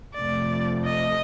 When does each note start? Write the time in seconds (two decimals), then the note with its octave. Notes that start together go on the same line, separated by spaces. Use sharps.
0.15 F2 C3 F3 A3 D5
0.86 D#5